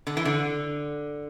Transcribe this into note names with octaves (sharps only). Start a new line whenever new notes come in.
D3
E3
D3